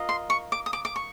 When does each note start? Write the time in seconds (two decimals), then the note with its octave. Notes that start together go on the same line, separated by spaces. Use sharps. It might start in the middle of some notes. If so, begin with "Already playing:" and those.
Already playing: F4 A#4 D#5
0.09 C6
0.30 C#6
0.52 D6
0.66 D#6
0.73 D6
0.85 D6
0.96 C#6